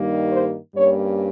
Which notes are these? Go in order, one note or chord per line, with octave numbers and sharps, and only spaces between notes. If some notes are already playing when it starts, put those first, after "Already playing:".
Already playing: G2 D#3 G3 A#3 D#4
C5
G2 G3 A#3 C#4 C#5